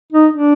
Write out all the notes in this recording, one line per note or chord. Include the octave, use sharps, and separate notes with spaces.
D#4
D4